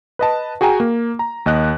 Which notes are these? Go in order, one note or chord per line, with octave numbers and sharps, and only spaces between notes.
B4 D#5 A5
F#4 G#4 G5 G#5 A#5
A#3
A#5
D#2 D#5 F#6